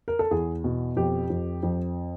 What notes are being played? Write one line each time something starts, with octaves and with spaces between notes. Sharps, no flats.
A#4
A4
E2 G#4
B2
F2 G4
F2
F2